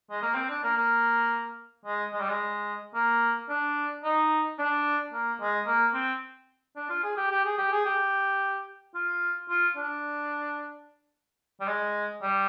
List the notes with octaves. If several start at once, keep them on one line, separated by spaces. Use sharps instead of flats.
G#3
A#3
C4
D4
A#3
A#3
G#3
G#3
G3
G#3
A#3
D4
D#4
D4
A#3
G#3
A#3
C4
D4
F4
G#4
G4
G4
G#4
G4
G#4
G4
F4
F4
D4
G3
G#3
G3